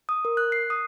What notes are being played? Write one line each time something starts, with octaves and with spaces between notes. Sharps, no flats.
D#6
A#4
F#6
C7
D#6